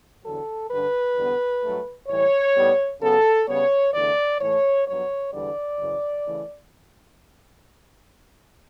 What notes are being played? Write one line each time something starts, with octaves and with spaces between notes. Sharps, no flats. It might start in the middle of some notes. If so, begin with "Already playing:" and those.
E2 D3 F#3 A4
G2 D3 G3 B4
E2 D3 G3 B3
G2 F#3 A3
A2 E3 G3 C#5
A2 G3 B3
C#3 F#3 B3 A4
C#3 G3 B3 C#5
E2 D3 A3 D5
A2 E3 A3 C#5
G2 F#3 B3 C#5
E2 D3 G3 B3 D5
F#2 C#3 E3
C#3 E3 A3